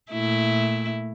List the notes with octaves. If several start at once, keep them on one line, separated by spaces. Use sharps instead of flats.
A#2 A3 E4